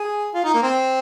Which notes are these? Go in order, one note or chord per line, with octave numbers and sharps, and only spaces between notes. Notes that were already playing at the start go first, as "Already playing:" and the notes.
Already playing: G#4
F4
D#4
A#3
C4